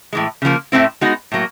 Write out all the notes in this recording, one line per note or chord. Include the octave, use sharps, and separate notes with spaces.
A2 E3 G#3
C#3 F3 A#3
A2 F3 A3 C4 E4
G#3 B3 D#4 F#4
A2 F#3 A#3